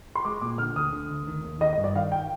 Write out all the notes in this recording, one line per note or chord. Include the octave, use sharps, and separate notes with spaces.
C6
G#3 D6
A#2 D6
D3 F6
D2 D#6
D3
D2
D#3
D#2
D#3 D#5
D#5
G2
D5
D#3 F5
G5